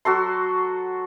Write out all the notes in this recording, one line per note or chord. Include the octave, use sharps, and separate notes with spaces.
F#3 F#4 A4 C6